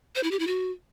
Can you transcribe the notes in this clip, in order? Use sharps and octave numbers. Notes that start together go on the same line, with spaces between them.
C5
E4
G4
E4
F#4